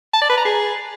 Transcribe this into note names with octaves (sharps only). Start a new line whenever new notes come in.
A5
D5
B4
A#5
G#4